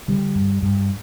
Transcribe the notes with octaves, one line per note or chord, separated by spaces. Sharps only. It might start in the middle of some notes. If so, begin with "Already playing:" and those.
D3 G3
G2
G2